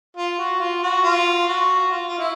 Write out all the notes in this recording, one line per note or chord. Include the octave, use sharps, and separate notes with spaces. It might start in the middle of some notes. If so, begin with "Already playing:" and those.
F4
F#4
F4
F#4
F4
F#4
F4
F4
E4